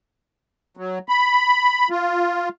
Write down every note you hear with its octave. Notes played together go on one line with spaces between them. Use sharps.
F#3
B5
F4